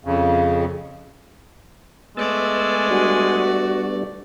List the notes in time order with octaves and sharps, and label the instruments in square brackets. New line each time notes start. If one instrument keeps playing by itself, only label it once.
[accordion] F2 C#3
[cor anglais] G#3 [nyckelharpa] A3 D5 [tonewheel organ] B3 E6 A6
[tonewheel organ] G3 B3 D4 [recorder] F#4